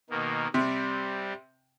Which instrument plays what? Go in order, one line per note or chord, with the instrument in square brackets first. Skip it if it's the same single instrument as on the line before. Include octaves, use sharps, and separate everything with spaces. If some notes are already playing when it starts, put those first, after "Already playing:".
[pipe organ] B2 D#3 A#3
[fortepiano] C3 [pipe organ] G3 C4